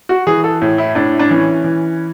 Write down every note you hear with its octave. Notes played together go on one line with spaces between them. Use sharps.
F#4
E3 G#4
A4
A2
E4
A2 D4
D4
E3 C#4
E3